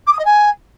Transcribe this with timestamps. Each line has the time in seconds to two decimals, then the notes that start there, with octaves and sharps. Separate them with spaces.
0.07 D6
0.13 D#6
0.19 D#5
0.25 G#5